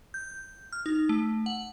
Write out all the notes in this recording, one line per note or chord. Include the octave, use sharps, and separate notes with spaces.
G6
F6
D#4
A3
F#5